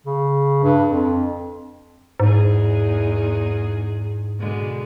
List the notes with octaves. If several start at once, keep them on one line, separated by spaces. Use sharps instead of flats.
C#3
G2
F2
E2 G#2 D#4 G#4
B2 D3 G#3